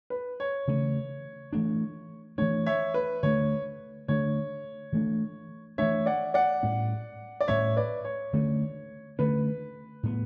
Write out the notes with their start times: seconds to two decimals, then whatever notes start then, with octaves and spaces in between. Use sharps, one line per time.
0.10 B4
0.40 C#5
0.68 C#3 E3 A3 C#4
1.53 E3 A3 D4
2.38 E3 A3 D4 C#5
2.66 C#5 E5
2.94 B4
3.23 D3 A3 D4 C#5
4.08 D3 A3 D4 C#5
4.92 E3 A3 D4
5.78 E3 A3 D4 C#5 E5
6.06 D5 F#5
6.34 D5 F#5
6.63 A2 G3 C#4
7.40 D5
7.48 A2 G3 C#4 C#5 E5
7.76 B4 D5
8.05 C#5
8.33 D3 A3 C#4
9.19 D3 A3 C#4 B4
10.03 A2 G3 B3